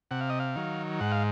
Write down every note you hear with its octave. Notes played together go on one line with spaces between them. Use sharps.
C3 F#5
F5
D#5
F5
D#3 F#3
G#2 F#5
F5